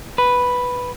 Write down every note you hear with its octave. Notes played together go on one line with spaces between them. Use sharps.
B4